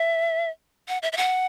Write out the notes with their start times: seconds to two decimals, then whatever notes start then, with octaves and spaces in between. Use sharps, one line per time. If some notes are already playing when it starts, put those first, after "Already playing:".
Already playing: E5
0.88 F#5
1.02 E5
1.12 E5
1.17 F#5